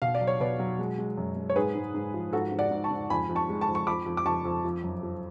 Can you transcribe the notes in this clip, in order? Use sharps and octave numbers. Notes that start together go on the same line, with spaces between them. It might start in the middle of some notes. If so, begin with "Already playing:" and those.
B2 F5
D5
F#3
C#5
B2 B4 D5
F#3
G#3
G#3
F#2
G#3
C#5
G#2 G#4 B4
G#2
G#2
F3
G#2 F#4 A4
G#2
D5 F#5
G#2
A5 C#6
G#2
F2 G#5 B5
F2
A5 C#6
G#3
A5 C#6
F2
C#6
F2 B5 D6
F2
D6
F2 A5 C#6
F2
F3
F#2
F3